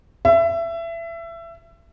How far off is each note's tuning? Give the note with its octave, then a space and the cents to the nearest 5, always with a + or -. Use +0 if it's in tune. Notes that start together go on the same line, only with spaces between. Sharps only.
E5 +25